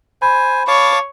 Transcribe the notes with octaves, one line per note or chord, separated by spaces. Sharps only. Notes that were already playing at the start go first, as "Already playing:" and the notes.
C5 G#5 B5
C#5 F5 A5 D6